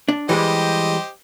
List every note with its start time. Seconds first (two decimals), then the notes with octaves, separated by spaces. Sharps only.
0.09 D4
0.29 E3 G3 G#3 G4 C5 D#5